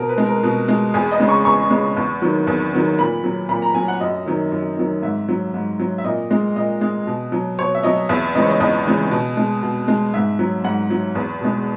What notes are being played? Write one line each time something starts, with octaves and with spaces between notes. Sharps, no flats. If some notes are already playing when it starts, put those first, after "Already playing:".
Already playing: B2 A#4
B4
G#3
A#4
B2 F#4
G#3
E2 G#4
D#5
C#3 G#3
C#6
E2 C#6
C#3 G#3
E2
D#3 F#3
E2
D#3 F#3
A#2 B5
F#3
A#2 B5
A#5
F#3 G#5
F#5
F#2 D#5
D#3 F#3
F#2
D#3 F#3
G#2 E5
F#3
G#2
F#3
E5
A#2 D#5
G#3
A#2 D#5
G#3
B2
F#3
B2 C#5
E5
F#3 D#5
E2 E5
C#3 E3 G#3 D#5
C#5
D#5
E2 D#5
C#3 E3 G#3
B2
G#3
B2
G#3
G#2 E5
F#3
G#2 F#5
F#3
E2
B2 G#3